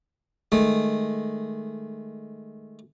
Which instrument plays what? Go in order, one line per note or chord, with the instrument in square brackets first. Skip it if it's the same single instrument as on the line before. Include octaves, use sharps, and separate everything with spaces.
[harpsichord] D#3 G#3 A3